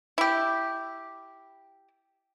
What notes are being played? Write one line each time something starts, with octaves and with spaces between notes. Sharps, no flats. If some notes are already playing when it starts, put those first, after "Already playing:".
E4 G4